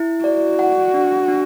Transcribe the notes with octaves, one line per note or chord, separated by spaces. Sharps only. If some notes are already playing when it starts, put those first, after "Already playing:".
Already playing: E4
F#4 D5
F#5
D4
D4